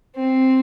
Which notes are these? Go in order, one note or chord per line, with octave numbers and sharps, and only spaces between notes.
C4